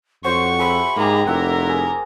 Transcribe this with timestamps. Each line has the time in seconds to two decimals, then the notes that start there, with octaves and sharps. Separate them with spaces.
0.24 F2 F#4 C5 C#5 C#6
0.59 G#4 C5 E5 B5
0.97 G#2 A#3 G4 G#4 A#5
1.27 F1 E4 A#4 F#5 A#5 E6
1.70 G#4